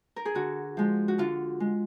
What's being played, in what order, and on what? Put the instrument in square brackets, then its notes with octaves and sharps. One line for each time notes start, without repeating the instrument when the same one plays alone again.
[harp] A#4
G#4
D3 F#4
F3 G#3
F#4
D3 F4
G#3